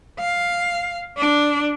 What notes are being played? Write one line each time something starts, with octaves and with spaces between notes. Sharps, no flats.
F5
D4